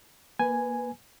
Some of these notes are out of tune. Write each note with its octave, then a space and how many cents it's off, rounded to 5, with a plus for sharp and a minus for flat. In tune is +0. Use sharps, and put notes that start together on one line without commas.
A#3 +25 B4 +10 G#5 +0